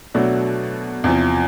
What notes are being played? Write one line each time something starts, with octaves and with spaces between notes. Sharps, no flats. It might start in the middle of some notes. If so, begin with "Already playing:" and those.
B2 F#3 A3 D4 F#4
E2 C3 F3